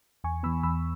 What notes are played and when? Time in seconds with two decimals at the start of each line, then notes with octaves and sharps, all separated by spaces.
0.24 E2 G#5 C#6
0.43 E3 B3 B5 E6
0.63 E2 B5 E6